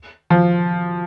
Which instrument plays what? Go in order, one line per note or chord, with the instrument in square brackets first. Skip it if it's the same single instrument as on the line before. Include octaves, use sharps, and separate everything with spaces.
[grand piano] F3